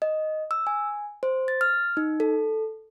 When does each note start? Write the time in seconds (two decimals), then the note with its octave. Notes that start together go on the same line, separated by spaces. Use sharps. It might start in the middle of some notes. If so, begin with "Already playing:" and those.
0.02 D#5
0.51 E6
0.67 G#5
1.23 C5
1.48 A6
1.61 F6
1.97 D#4
2.20 A4